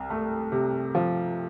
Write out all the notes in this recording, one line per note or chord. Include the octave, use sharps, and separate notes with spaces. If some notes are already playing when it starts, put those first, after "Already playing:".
Already playing: C2
A3
C3
F3